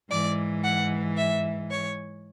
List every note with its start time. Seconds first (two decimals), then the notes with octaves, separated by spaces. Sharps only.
0.11 G#2 E3 D5
0.64 F#5
1.17 E5
1.70 C#5